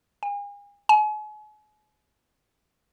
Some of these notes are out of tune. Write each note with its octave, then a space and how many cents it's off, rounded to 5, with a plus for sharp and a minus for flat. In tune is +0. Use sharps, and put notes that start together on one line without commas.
G#5 -40
G#5 +40